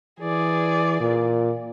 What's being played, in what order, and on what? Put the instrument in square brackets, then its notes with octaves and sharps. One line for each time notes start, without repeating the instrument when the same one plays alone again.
[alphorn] E3 [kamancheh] G#4 D5
[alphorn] A#2